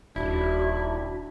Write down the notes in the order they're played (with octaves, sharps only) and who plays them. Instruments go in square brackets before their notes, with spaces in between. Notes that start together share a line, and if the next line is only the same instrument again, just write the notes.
[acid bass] D#1 [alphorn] D4 [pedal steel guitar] E4 [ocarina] F#4